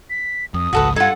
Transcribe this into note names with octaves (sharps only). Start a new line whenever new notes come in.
B6
F2 D#6
G#1 C#2 F#4 A4 B4
G2 D#4 F4 A4 F#5 G#6